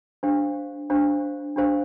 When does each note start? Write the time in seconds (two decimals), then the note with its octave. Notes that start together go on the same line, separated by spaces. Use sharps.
0.23 D4 G4 C5 F5
0.90 D4 G4 C5 F5
1.56 D4 G4 C5 F5